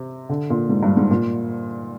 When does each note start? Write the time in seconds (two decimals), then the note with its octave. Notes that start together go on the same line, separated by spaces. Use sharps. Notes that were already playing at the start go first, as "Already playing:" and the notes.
Already playing: C3
0.29 D3
0.50 A#2
0.69 G#2
0.83 G2
0.97 G#2
1.11 A#2